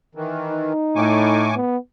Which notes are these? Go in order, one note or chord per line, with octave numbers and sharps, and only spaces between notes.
D#3 E3
D#4
A2 G#5 C#6 D6
B3